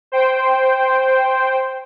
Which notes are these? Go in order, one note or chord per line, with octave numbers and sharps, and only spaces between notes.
C5 G5